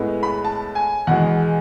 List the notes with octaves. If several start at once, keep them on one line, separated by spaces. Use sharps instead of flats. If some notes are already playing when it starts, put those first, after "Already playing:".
Already playing: A2 G#3 B3
B5
A5
G#5
E2 B2 G#3 F#5